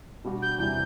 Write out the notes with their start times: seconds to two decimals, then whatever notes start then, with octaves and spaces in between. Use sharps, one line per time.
0.24 B2 G3 D4 F#4
0.42 G6
0.58 E2 C3 E3 G3 G6